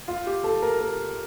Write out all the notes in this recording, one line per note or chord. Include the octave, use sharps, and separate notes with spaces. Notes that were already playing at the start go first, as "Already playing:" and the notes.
F4
G4
A4
A#4
A#4